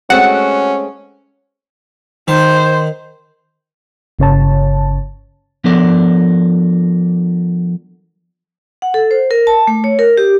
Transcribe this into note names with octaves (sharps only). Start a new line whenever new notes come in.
G#3 A3 C4 C#4 F#4 F#5
D#3 C5
G1 C#3 C#5 A5
F3 B3 D4 A4 A#4 D5
F#5
A4
C5
A#4
A5
A3
C#5
A#4
G4